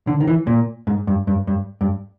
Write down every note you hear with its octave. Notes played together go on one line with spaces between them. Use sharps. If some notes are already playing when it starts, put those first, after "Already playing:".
D3
D#3
E3
A#2
G#2
G2
G2
G2
G2